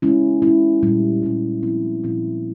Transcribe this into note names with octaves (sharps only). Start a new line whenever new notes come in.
G#3 C#4 E4
G#3 C#4 E4
A#2 G3 C#4
A#2 G3 C#4
A#2 F3 C4 E4
A#2 F3 C4 E4